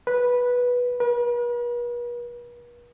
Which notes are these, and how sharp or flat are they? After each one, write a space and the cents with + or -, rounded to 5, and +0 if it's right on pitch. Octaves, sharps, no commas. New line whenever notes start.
B4 -10
B4 -45